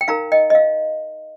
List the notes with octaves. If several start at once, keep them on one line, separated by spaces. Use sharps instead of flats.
G5
D#4 A#4 F5 A#5
D#5 G5
D#5
F5